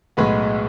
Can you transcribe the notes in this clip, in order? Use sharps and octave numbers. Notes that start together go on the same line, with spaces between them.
B1 A2 G#3 B3 B4